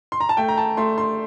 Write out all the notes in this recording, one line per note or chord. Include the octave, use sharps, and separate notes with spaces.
C6
A#5
A5
A3 G5
A#5
A5
A3 C6
C6